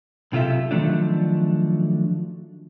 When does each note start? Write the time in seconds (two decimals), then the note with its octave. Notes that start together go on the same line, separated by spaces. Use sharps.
0.32 B1 C3 F4 A4 E5
0.71 D#3 F3 F#3 A3 D4